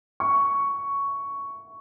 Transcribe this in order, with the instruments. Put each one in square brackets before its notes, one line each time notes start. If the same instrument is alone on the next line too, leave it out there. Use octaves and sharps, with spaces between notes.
[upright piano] C#6